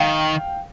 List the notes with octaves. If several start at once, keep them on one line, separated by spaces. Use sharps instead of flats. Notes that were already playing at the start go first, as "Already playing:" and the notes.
Already playing: D#3 F5 G5